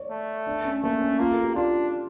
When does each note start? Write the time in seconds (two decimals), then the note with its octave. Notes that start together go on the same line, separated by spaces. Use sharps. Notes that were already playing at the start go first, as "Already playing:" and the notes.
Already playing: C#5 D5
0.10 A3
0.47 D4
0.65 C#4
0.83 A3 A#3
1.01 C#4
1.19 A#3 F4
1.31 A4
1.43 G4
1.55 D4 F4